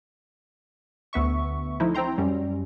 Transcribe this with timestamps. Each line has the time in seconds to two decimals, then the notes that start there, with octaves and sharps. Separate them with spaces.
1.13 D2 B3 E5 C#6
1.80 F3 A3 D#4 E4
1.94 C4 E4 G5 A#5 C6
2.18 F#2 G3 C#4